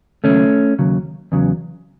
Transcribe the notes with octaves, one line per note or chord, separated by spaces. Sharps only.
D#2 C#3 F#3 A3 C#4
D#2 C#3 F#3
E2 C#3 F#3